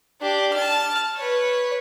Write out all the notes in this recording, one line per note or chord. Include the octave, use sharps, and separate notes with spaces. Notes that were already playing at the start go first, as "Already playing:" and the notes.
D4 G4
A5 F6
B4 C#5